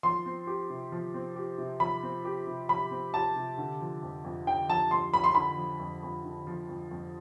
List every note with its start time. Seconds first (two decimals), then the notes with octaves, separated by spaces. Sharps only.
0.03 F3 C6
0.26 C4
0.47 G4
0.70 C3
0.92 F3
1.14 C4
1.36 G4
1.58 C3
1.80 F3 B5
2.03 C4
2.25 G4
2.47 C3
2.69 F3 B5
2.91 C4
3.14 G4 A5
3.36 C3
3.58 D3
3.81 F3
4.03 F2
4.24 F2
4.47 D3 G5
4.69 F3 A5
4.91 F2 C6
5.13 F2 B5
5.24 C6
5.35 D3 B5
5.57 F3
5.80 F2
6.03 F2
6.24 D3
6.47 F3
6.69 F2
6.91 F2